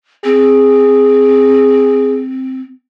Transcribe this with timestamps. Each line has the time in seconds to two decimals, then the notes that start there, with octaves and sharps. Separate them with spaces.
0.24 C4 G#4